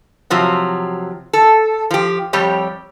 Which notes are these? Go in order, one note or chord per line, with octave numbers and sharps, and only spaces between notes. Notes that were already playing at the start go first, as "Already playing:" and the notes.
C3 F3 F#3
A4
F3 G4
F2 G3 G4 C#5